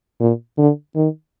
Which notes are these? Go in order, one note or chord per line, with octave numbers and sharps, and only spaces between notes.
A#2
D3
D#3